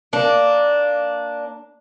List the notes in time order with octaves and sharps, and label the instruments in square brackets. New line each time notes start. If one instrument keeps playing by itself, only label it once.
[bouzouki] A#3 D4